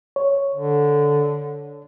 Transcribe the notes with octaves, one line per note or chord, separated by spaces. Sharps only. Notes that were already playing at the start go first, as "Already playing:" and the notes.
C#5
D3